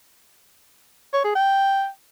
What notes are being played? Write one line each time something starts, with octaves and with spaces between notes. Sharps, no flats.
C#5
G#4
G5